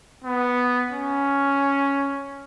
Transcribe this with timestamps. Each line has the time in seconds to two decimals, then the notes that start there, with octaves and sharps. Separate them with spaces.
0.24 B3
0.90 C#4